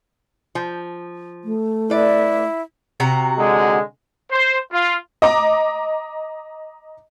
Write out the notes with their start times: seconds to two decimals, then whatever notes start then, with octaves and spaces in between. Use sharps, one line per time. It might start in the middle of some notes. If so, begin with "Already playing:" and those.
0.55 F3
1.44 A3
1.90 E4 B4 D5
3.00 C3 F#4 A#5
3.38 D3 G#3
4.31 C5
4.70 F4
5.22 D#5 A#5 D6